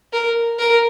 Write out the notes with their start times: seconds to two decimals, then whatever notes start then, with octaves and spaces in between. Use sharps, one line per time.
0.13 A#4
0.59 A#4